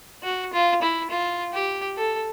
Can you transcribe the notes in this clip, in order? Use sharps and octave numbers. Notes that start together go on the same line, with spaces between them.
F#4
F4
E4
F4
G4
A4